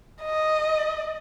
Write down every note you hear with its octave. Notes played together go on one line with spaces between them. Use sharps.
D#5